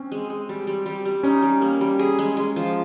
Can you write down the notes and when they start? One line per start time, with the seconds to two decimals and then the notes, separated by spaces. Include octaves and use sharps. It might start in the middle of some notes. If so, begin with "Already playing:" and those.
Already playing: C4 C#4
0.12 G#3
0.30 G#3
0.49 G3
0.67 G3
0.86 G3
1.05 G3
1.23 C#4 D#4
1.42 G3
1.61 A#3
1.81 G3
1.99 G#4
2.19 G#3
2.37 G#3
2.56 F3